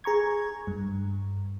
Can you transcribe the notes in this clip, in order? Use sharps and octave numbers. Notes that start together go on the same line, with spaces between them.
G#4 A#5 C#6 G#6
G2